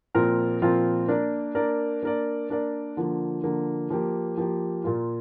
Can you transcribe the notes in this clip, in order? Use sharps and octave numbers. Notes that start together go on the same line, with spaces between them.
A#2 F3 C4 F4 A#4
A#2 F3 C4 F4 A#4
A#3 D4 A#4 D5
A#3 D4 A#4 D5
A#3 D4 A#4 D5
A#3 D4 A#4 D5
D3 F3 A#3
D3 F3 A#3
F3 A#3 G4
F3 A#3 G4
A#2 A#3 F4